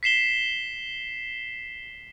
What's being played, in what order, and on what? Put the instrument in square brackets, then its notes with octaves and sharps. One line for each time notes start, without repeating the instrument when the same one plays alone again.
[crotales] B6 C7 E7 G7